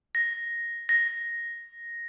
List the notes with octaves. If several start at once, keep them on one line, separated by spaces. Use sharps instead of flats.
A#6
A#6